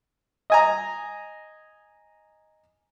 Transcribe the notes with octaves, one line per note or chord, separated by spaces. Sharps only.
D#5 G#5 A#5